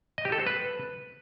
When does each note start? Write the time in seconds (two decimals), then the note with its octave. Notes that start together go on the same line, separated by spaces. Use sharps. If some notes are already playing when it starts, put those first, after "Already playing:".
0.18 D#5
0.25 G4
0.32 A4
0.39 C5
0.47 B4